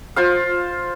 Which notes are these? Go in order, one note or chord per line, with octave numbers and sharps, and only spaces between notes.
F4 C5 F5